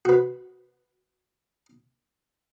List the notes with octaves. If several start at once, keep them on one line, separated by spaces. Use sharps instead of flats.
F#4 B4